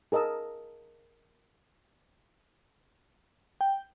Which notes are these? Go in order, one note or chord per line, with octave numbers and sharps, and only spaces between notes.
G#4 A#4 D#5 A5 E6
G5